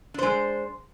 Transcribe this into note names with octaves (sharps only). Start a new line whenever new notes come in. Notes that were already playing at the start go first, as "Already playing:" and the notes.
G#3 D4 C5